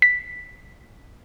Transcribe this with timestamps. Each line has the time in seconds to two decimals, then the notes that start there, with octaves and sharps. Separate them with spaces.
0.02 B6